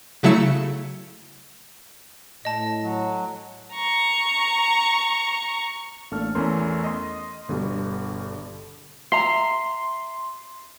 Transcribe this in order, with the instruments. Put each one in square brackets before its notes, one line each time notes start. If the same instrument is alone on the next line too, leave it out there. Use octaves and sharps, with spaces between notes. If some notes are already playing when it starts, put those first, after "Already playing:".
[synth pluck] C#3 F#3 A3 E4 C#7 E7
[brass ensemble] A2 [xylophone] D#5 A5
[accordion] F#3
[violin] A#5 C#6
[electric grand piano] A1 A3 A#3 D4 A5 F6
E2 E3 A3 C#4 A#4 C6
D#5 C6
G1 B2 D3 G3
[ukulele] E5 A#5 [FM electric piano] C6